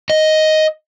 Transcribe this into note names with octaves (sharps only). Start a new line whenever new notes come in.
D#5